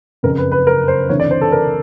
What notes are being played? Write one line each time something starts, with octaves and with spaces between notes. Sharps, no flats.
F#1 F2 C#3 A#4
B4
B4
A#4
C5
D2 C3 E3 C#5
D5
C5
A4
A#4